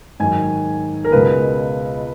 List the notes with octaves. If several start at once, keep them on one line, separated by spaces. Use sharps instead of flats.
G#2 D#3 F#3 G#5
A#4
C#2 B2 G#3 B4